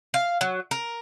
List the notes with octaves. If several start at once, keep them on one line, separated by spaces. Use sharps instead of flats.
F5
F#3
A#4